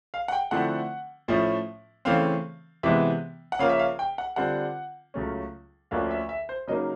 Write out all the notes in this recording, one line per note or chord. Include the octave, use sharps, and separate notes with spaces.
F5
F#5
G5
D3 F3 A3 C4 E4 F#5
A2 F3 A3 C#4 E4
C#3 E3 A3 C4 F5
C3 E3 G#3 B3 E5
F#5
C#3 F3 A#3 C#4 F5
E5
F5
G5
F#5
D3 G3 C4 F4 F#5
C#2 C#3 F#3 A3 C#4
D2 D3 F3 A#3 C#4 F5
E5
E5
C5
C#3 F#3 A#3 D#4 D#5